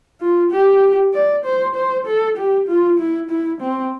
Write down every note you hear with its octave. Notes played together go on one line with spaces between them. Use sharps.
F4
G4
D5
C5
C5
A4
G4
F4
E4
E4
C4